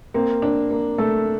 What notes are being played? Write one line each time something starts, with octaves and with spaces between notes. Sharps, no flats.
A#3 C4
D4
A#3
A3 A4